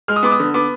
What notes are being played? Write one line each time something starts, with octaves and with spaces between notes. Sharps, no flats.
G#3 F6
D#6
B3 D6
D#6
D3
B3 D6